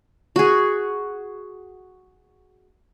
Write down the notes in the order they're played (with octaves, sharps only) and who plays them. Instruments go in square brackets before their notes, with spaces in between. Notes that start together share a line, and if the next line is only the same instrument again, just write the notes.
[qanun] F#4 G#4